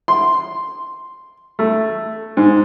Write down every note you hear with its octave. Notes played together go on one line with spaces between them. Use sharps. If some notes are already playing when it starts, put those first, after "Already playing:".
C6
A3
G#2